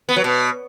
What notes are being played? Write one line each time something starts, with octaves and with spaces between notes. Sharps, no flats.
B3
F#3
B2